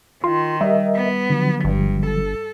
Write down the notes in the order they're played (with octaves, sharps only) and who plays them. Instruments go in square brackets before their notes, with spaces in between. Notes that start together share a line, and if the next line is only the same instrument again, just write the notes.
[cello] D#3 [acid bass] F4 [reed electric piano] C6
[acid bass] G3 [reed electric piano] A#4 D#5 E5
[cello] B3
[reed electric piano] D3 F3 F#3
[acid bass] G1 [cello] G2
[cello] A4